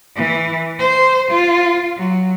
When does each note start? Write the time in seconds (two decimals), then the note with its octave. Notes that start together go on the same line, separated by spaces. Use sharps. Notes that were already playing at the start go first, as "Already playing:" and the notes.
0.16 E3
0.79 C5
1.31 F4
1.97 F#3